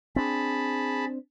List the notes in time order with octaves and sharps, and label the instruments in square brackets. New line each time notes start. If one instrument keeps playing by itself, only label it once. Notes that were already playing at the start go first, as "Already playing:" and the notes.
[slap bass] C4 D4 [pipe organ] G#4 A5 B5